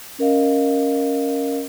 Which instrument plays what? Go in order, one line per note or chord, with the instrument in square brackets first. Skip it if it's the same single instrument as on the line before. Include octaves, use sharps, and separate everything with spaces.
[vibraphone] C#4 A#4 D#5 F5